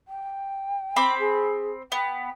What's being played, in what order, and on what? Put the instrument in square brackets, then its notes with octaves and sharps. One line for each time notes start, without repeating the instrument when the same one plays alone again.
[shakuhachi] G5
[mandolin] C4 B5 D6
[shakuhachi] G#4
[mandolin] B3 [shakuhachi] G5